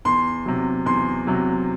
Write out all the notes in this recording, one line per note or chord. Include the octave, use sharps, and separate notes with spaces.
E2 C6
C3 F#3
E2 C6
C3 F#3